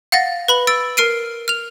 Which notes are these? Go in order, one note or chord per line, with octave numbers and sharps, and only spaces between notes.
F5 F#5 A6 A#6
B4 B5 F#7
E6 A6 D7
A#4 F6 C7 D7 D#7
F6 F7